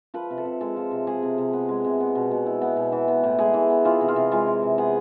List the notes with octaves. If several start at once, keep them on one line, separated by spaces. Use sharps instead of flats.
F3 B4
C3
A4
C3
G#3 A4
F3
C3
G#3 G#4
C3
C3
B3
G#3
C3
B3
B2
B2
E4
B3
B2
E3
B3
A2
G#3 G#4
E3
B3
E3 F4
C3
F4
C3
G#3 F4
E3
C3
B3 G#4